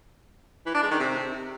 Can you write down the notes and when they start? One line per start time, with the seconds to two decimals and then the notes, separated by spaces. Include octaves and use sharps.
0.66 E3
0.75 D4
0.83 G#3
0.91 D#3
0.99 C3